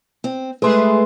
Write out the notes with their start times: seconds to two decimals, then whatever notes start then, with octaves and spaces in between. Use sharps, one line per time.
0.24 C4
0.62 G#3 A3 G#4 B4 C6